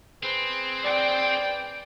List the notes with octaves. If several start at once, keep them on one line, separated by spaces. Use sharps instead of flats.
C4 G#4 B4 C5
D5 G5